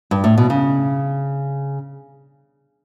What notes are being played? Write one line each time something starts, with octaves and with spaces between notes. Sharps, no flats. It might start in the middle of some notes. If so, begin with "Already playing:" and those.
G2
A2
B2
C#3